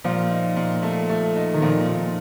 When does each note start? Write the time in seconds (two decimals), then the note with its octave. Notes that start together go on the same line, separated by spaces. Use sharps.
0.04 A#2 F3
0.31 D#4
0.56 A#2
0.82 A3
1.09 A3
1.36 D#4
1.54 D#3
1.62 A#2 F3
1.88 A#2